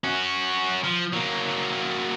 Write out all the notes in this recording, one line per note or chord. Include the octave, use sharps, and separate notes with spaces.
C#4 F#4
F3
F#3 A#3